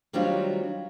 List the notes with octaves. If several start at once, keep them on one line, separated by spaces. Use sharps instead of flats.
D#3 F#3 G3 C4 D4 F4